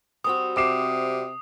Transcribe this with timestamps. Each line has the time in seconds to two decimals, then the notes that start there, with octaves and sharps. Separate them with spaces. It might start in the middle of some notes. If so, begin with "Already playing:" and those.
0.24 G3 C4 F#4 D#6
0.57 C3 D6 C7 E7